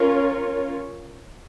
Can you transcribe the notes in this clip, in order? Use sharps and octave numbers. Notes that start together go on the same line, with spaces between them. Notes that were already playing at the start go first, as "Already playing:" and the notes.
Already playing: C#4 F4 A#4 C#5